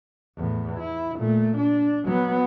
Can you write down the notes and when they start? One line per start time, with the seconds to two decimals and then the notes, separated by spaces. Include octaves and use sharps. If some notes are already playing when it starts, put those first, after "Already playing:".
0.37 E2 A2
0.80 E4
1.17 A#2 A3
1.57 D4
2.05 F#3 B3